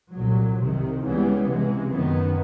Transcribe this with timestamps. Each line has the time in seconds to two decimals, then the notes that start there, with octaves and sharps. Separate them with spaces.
0.13 C2 A#2 F#3
0.59 C2 C3 D#3
1.03 C#2 C#3 E3 G3 B3
1.47 C#2 C3 E3 G#3
1.92 F#2 D#3 F#3 B3